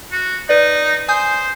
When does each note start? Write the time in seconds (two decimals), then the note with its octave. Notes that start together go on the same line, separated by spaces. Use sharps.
0.12 F#4
0.49 D#4 B4 D5
1.08 C5 G#5 D#6 G6